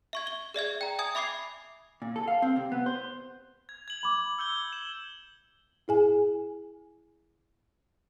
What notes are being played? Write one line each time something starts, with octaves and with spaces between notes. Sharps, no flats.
E5 C#6 G#6
G7
G#4 D5 E5 G#6
G5 A#5
E5 G#5 D#6 G#6
E5 B5 D6 G#6 C7
A#2
A4
F5
C4
C3
B3
C5
G#6
G#6 F#7
B5 D6
E6 G6 G7
E7
E4 G#4 G#5